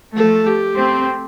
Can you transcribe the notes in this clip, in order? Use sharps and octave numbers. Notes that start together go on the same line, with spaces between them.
F3 A3 A4
G4
A3 C4